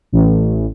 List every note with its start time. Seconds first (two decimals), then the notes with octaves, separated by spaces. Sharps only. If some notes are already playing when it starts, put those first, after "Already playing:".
0.13 A1